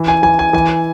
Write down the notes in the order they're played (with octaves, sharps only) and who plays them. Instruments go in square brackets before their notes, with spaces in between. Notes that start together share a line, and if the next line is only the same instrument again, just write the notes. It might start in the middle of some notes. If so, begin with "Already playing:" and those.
Already playing: [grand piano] E3
G#5
E3 G#5
G#5
E3 G#5